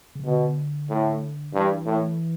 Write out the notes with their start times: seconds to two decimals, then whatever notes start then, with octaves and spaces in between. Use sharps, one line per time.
0.15 C#3
0.24 B2 D3
0.90 A2
1.53 G2 E3
1.85 A2